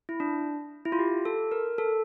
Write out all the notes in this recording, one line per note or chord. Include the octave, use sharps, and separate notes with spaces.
E4
D4
E4
F4
G4
A4
A#4
A4